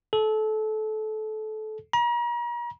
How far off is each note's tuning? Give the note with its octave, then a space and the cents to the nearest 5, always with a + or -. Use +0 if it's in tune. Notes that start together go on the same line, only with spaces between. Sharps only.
A4 -25
A#5 +40